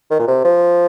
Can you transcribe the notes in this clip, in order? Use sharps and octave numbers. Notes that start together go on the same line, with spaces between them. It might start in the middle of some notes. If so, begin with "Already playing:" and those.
D#3
A#2
C3
F3